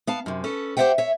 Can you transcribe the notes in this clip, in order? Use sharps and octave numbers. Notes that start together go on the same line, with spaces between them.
B3 F5 A5
F#2 C3
C#4 A4 B4
G4 C5 D5 E5 F#5 G5
C#5 E5